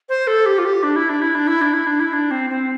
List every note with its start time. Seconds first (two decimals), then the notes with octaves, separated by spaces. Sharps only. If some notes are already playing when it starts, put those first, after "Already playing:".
0.09 C5
0.27 A4
0.46 G4
0.59 F4
0.65 G4
0.83 D4
0.96 E4
1.09 D4
1.22 E4
1.35 D4
1.47 E4
1.61 D4
1.73 E4
1.87 D4
2.00 E4
2.13 D4
2.31 C4
2.50 C4